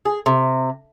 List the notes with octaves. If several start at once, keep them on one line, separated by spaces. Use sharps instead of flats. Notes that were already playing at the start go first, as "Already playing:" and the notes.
G#4
C3